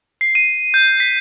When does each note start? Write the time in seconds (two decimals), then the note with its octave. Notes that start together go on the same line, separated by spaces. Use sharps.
0.21 C7
0.35 D#7
0.74 G6
1.00 B6